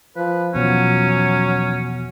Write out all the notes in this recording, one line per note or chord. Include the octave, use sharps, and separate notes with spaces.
F3 B4
E2 B2 F3 F#3 C#4